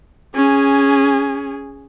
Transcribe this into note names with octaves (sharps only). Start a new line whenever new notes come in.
C#4 G#4